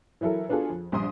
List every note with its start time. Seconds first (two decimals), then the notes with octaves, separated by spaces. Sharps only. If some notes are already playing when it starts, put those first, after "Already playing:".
0.21 E3 F#3 E4 A4 A#4
0.49 B3 D4 F4 F#4 G#4 A4
0.70 F2
0.92 A#1 G2 C6 D#6